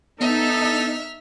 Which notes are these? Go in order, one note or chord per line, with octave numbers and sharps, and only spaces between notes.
B3 D#4 A4 E5 F6